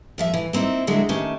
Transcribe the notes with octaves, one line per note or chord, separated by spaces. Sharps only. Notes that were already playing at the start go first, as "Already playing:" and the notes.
F#2 F3 E5
E3
A#3 C4 D#4 E4
D3 F#3 G#3 C4 E4
D#3 A3 C#4 G4 A5